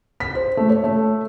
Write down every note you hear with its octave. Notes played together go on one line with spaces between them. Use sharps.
B6
C5
A3
C#5
A3